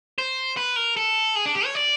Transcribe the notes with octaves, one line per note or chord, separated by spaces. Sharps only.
C5
B4
A#4
A4
G#4
D4
G4
C#5
D5